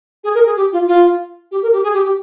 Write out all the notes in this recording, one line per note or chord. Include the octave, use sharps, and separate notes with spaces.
G#4
A#4
G#4
G4
F4
F4
G4
A#4
G4
G#4
G4
G4